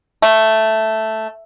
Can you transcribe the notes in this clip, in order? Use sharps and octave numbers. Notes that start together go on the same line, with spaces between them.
A3